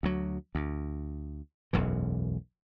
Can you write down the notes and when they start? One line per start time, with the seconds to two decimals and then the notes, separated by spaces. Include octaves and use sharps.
0.03 D2 F#3
0.55 D2
1.73 E1 B1 F#2 E3